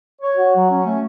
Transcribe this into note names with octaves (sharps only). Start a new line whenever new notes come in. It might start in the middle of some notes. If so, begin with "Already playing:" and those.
C#5
F#4
F#3
C#4
A3